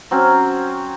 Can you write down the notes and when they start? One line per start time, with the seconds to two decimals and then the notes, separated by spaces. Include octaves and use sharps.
0.11 F#3 C4 C#4